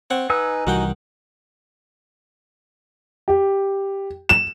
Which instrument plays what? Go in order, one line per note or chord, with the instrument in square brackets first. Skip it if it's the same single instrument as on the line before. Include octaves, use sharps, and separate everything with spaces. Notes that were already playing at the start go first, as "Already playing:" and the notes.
[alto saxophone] C4 [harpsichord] C#5 F#5 C#6
[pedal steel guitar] D#4 G#5 E6 [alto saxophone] B4
[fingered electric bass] C2 E3 G3 [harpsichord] D#3 F#5 G5 [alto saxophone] F#4
[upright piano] G4
E7